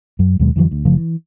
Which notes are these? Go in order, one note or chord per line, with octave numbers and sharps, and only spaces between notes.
F#2 F#3
D#2 B2 F#3 G#3
F2 D3 E3 F#3
D2
F#1 C#3 F3 A3
E3